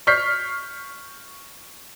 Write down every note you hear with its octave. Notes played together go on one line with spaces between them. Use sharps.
C#6 F6 G6 B6 C7